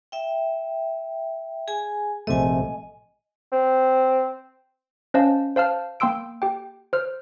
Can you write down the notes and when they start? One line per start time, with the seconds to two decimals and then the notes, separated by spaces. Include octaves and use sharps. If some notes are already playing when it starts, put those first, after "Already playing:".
0.12 E5 G5
1.68 G#4 G#5
2.27 A#1 C3 A3 D#5 G#5
3.52 C4
5.14 C#4 C5 D#5 F5 A5
5.56 C5 F5 A5 F6
6.00 A#3 G5 C6 E6 D7
6.42 G4 G5
6.93 C5 F6